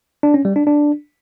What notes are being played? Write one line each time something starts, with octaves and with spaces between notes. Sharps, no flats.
D4
C#4
G3
D4
D4